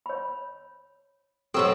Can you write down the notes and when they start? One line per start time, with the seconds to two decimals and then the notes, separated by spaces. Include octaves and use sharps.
0.06 C#5 B5
1.54 B2 F#3 C4 G4 A4 A#4